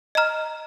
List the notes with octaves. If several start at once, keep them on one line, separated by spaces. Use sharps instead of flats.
D#5 A#5 F6